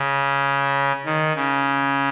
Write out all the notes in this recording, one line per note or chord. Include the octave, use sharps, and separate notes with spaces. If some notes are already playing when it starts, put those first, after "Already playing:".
Already playing: C#3
D#3
C#3